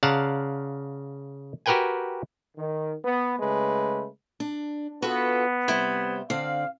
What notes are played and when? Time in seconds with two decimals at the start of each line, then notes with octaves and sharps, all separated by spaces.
0.03 C#3 D5 F5 F#5 A5 A#5
1.66 F#4 G4 A#4 B4 G5 G#5
2.57 D#3
3.04 B3
3.40 C#3 G#3 A3 B4
4.40 D4
5.02 B3 F4 F#4 A4 B4
5.68 C3 G3 E4 C5
6.30 D3 C4 D5 F5